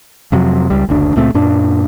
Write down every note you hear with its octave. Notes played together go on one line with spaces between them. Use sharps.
F2 C3 F#3
C#2 G3
F#1 D2 D4
C#2 A#2 A3 C4
F#2 A#2 D4